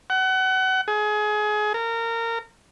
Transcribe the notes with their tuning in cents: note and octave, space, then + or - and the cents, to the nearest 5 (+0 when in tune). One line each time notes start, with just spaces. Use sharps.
F#5 +30
G#4 +25
A#4 -25